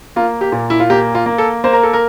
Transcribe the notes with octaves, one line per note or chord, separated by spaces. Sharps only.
A#3 F4
G4
A#2
E4
F4
A#3 G4
F4
A#3
A4
A#3 C5
A#4
A4
A#4